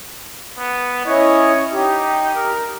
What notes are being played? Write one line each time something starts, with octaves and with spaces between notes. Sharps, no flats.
B3
C#4 E4 C#5 D#5
D#4 G4
A#4